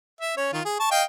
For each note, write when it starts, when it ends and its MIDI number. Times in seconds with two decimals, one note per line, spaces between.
0.21 0.33 76
0.37 0.51 61
0.37 0.51 73
0.53 0.60 51
0.53 0.60 65
0.65 0.80 68
0.80 0.87 81
0.80 0.87 85
0.91 1.03 75
0.91 1.03 77
0.91 1.03 79